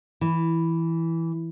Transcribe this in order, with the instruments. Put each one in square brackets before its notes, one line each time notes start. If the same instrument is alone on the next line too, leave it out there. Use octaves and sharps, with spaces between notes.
[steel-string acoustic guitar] E3